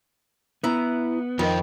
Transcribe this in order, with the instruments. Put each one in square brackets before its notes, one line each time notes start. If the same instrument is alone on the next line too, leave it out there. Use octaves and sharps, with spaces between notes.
[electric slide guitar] B3 [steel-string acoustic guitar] E4 A#5
[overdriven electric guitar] F2 C4 [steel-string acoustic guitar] D#3 [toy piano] F4 A#4 D#5